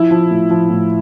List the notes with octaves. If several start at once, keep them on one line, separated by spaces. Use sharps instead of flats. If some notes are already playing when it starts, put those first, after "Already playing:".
Already playing: F3 E4
F3
A2
F3
A2